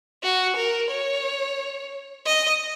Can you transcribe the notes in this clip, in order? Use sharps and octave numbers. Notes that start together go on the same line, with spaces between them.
F#4
A#4
C#5
D#5